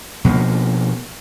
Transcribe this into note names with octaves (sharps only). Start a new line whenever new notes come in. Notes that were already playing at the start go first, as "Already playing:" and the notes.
B2 F3 A#3